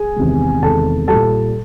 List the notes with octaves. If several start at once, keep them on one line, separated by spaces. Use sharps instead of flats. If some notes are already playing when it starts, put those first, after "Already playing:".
Already playing: G#4 G#5
E2 C3 D#3 G#3
E2 C3 D#3 G#3 A4 A5
G3 A4 A5
A#2